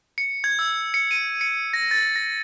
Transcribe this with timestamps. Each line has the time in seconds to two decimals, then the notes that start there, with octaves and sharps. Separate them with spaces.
0.18 C#7
0.44 G#6
0.59 E6
0.94 C#7
1.11 D#7
1.41 C#7
1.73 A#6
1.91 A6
2.16 A#6